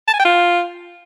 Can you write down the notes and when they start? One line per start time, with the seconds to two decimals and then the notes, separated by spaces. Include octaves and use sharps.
0.08 A5
0.14 G#5
0.19 G5
0.25 F4